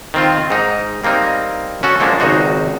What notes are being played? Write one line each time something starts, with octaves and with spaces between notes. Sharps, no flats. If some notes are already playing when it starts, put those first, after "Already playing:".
D#3 C4 F4
G#2 D#4
G3 A#3 C4 D#4
C#4 F#4 A4
F3 G#3 A#3 C#4 D4
G#1 C#2 D#4 F#4 C5